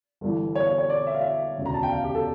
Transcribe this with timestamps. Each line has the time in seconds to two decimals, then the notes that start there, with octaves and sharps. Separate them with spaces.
0.21 G1 G2 E3
0.55 C#5
0.67 C#5
0.78 C#5
0.90 D5
1.07 E5
1.14 F5
1.21 E5
1.58 E1 D2 C#3
1.66 A#5
1.74 A5
1.83 G5
1.92 F5
2.04 G4
2.15 A4